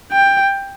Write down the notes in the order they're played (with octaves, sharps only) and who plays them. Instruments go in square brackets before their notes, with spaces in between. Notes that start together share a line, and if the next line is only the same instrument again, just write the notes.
[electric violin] G5